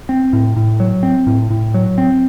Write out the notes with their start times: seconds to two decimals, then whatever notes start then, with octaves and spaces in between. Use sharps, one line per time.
0.09 C4
0.33 A2
0.56 A2
0.80 F#3
1.03 C4
1.27 A2
1.50 A2
1.74 F#3
1.98 C4